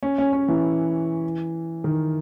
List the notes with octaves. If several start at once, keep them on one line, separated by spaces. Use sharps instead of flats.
C#4
C#4
C#4
E3
D#3